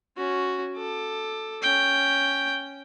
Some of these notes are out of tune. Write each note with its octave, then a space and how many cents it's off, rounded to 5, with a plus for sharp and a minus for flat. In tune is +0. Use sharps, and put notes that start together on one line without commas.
C#4 +0 F#4 +0
A4 +0 D6 +25
C#4 +0 G5 +0